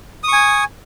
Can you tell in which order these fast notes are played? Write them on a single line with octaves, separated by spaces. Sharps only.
D#6 C#6 G#5